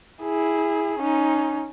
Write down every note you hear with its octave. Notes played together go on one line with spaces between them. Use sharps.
E4 G#4
C#4 D#4